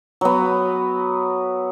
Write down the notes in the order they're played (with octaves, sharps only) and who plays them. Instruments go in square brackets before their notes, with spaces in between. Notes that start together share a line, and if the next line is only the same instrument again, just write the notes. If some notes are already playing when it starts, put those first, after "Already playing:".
[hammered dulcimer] F#3 B3